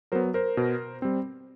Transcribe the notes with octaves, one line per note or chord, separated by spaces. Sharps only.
F#3 B3 A#4 C5
A#4 C5
B2
G3 C4